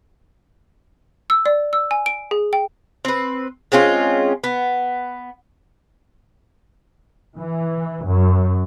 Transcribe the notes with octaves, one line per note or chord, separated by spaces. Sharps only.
E6
D5
E6
G#5
D7
G#4
G5
C4 B4
G#3 C4 C#4 F4
B3
E3
F#2